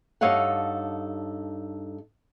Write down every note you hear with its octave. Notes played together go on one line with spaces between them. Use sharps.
G2 D#4 A4 C#5 F5 F#5